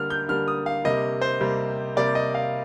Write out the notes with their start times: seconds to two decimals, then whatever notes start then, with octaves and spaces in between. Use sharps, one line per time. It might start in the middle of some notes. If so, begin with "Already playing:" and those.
Already playing: D3 G3 A#3 F6
0.10 G6
0.29 D3 G3 A#3 F6
0.48 D#6
0.66 F5
0.85 C3 G3 A#3 D#5
1.22 C5
1.41 C3 G3 A#3
1.96 C3 G3 A#3 D5
2.15 D#5
2.34 F5